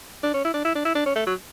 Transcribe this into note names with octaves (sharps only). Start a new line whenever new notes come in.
D4
C#4
E4
D4
E4
D4
E4
D4
C#4
A3
F#3